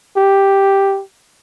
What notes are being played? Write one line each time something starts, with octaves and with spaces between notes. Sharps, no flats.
G4